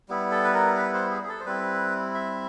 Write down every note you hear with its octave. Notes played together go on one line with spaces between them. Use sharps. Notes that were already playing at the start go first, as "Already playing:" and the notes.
G3 B3 E4
A4
B4
A#4
B4
C5
G#4
G#4
A4
C5
G3 C4 E4 B4
E5